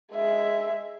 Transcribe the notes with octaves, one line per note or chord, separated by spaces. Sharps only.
G#3 E5